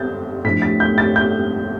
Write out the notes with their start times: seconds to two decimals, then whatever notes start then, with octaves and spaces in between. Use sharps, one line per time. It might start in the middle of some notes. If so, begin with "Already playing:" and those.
Already playing: G6 A6
0.44 A2 F3 A3 D4 B6
0.62 A6
0.80 G6
0.98 A6
1.16 G6